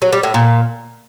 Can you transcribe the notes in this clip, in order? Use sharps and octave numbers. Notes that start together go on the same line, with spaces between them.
F#3
G3
A2
A#2